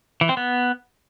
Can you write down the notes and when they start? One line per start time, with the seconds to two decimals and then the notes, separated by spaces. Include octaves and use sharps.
0.21 E3
0.29 C4
0.37 B3